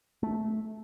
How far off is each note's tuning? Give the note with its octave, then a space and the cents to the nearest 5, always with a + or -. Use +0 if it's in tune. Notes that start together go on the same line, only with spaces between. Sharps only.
A3 -15